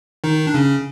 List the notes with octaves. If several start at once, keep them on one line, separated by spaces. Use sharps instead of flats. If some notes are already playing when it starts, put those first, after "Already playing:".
D#3 D#4
D4
C#3 C#4